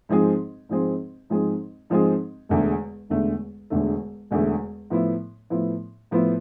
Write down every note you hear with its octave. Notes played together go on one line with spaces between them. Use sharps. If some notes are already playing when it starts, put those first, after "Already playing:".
G#2 F3 G#3 C4 G#4
G#2 F3 G#3 C4 G#4
G#2 F3 G#3 C4 G#4
G#2 F3 G#3 C4 G#4
E1 E2 D3 A3
E1 E2 D3 A3
E1 E2 D3 A3
E1 E2 D3 A3
A2 F3 B3 E4
A2 F3 B3 E4
A2 F3 B3 E4